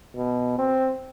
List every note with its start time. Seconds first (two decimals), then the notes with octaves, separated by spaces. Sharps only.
0.15 B2
0.59 C4